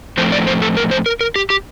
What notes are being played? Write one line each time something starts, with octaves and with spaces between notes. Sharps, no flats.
A2 F3 A3 C4 C5
D5
C5
A4
A#4
C5
A#4
A#4
G4
G4